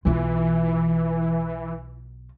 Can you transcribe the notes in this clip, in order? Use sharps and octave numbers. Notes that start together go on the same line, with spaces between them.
B1 E3 F4